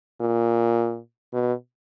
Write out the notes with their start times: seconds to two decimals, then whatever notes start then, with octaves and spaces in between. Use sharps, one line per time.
0.21 A#2
1.33 B2